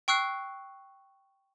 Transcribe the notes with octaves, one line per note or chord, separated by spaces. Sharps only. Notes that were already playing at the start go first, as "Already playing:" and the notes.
G5 C#6 E6 F#6 C7